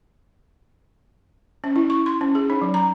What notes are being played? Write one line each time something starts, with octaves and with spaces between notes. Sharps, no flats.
C#4
E4
C#6
C6
C#4
G#4
D#4
F#3
A#5